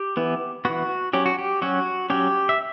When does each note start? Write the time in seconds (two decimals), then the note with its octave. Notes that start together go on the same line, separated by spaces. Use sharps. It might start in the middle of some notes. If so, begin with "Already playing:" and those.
Already playing: G4
0.17 E3 B3
0.65 E3 B3 F#4
1.13 F#3 C#4 G4
1.26 F#4
1.39 G4
1.62 F#3 C#4 F#4
2.10 F#3 C#4 G4
2.49 E5